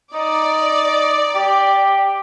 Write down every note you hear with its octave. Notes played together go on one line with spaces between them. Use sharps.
D#4 D5
G4